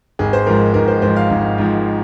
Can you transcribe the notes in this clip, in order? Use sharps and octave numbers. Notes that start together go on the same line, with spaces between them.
G#1 G#4
C5
G#2 F3 A#4
G#1 A#4
C5
G#2 F3 C5
F5
G#1
G#2 F3